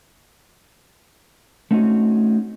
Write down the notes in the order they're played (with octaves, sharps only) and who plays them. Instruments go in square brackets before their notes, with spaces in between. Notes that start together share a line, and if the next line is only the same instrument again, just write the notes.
[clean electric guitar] A3 C4 C#4 D#4 F#4